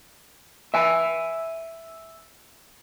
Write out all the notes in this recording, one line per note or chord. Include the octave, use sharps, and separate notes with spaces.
E5 G#5